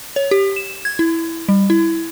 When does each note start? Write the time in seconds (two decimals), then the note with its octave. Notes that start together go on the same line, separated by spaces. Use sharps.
0.16 C#5
0.31 G4
0.56 E7
0.85 G#6
0.99 E4
1.49 G3
1.70 E4